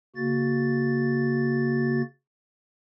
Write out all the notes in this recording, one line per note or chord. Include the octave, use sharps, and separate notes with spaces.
C#3 A#3 F#4 A6